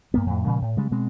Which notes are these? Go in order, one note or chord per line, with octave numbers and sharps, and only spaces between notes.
G2 A#3 B3
F2 A2
A#2 C#3 F3 G#3
A2
C#3 G3 G#3
B2 G#3 C4